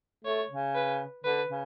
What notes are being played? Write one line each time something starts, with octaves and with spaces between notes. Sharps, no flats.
A3 C#5
C#3
B4
D3 B4
C#3